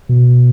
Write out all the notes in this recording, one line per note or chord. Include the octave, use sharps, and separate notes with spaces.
B2